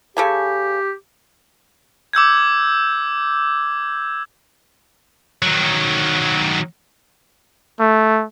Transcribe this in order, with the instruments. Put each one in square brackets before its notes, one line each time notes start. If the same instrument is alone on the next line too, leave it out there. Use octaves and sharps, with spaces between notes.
[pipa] C#3 A4 G#5 [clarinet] G4
[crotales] D6 E6 G6 G#6
[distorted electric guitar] D#3 F#3
[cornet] A3